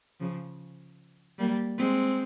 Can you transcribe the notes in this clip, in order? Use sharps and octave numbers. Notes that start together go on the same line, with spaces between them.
C#3 F3
G3 A#3
G#3 C4